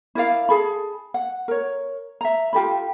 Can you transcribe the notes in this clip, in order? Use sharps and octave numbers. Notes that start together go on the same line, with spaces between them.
E4 A#4 D5 F5
G#4 A4 B5
F#5
A#4 C#5
E5 A#5
F4 G4 A4 B5